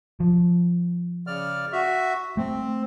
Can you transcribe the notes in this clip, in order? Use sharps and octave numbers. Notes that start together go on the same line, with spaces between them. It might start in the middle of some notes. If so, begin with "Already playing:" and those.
F3
C#3 D5 F6
F#4 E5
A3 C4